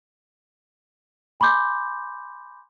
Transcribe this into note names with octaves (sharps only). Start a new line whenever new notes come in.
G#5 B5 C6 D6 G6